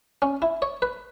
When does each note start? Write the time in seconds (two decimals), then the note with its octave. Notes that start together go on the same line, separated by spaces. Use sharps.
0.22 C#4
0.42 E4
0.62 C#5
0.82 B4